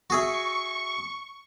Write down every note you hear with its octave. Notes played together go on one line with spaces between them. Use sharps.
F#4 G#4 E5 C#6